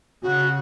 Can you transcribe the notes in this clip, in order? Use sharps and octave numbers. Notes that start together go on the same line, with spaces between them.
C#3 F#4